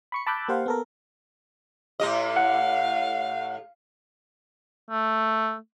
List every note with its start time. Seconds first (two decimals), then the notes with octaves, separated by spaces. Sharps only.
0.12 B5 C#6 C#7
0.27 A5 B5 D6 E6 F#6 G6
0.48 A#3 G4 C5 F5 F#5
0.66 B3 A4 A#4
2.00 A2 G4 D#5
2.36 F5 F#5
4.90 A3